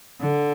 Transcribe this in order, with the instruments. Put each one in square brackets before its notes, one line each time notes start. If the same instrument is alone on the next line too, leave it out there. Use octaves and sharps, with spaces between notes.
[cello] D3